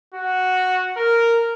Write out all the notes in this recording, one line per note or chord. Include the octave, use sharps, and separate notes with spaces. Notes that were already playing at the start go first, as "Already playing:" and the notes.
F#4
A#4